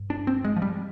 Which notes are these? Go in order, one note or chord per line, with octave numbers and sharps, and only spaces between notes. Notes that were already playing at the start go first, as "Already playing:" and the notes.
Already playing: G2
D4
C4
G#3
F3
G3